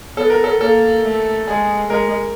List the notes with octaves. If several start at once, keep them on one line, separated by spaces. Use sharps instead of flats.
B3 A4
A#4
A4
A#3 A4
A3
G#3 G#4
G#3 A#4